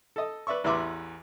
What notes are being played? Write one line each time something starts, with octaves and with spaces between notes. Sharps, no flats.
A4 D#5
B4 D5 E5 C#6
A1 E2 B4 E5 C6 D6